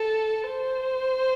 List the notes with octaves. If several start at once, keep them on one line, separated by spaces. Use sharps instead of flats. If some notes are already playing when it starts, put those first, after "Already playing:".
Already playing: A4
C5